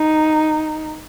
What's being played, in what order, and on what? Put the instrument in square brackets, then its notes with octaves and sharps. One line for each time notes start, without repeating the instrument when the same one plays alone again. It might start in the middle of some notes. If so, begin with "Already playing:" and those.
Already playing: [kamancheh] D#4